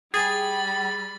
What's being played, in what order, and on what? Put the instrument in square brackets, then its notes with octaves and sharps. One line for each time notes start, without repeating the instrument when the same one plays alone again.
[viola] G3 B5 [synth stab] G#4 [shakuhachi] G5 [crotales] A6